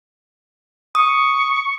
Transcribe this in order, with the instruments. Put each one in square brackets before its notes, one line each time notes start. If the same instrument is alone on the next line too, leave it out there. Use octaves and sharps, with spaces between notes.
[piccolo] C#6 [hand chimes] D#6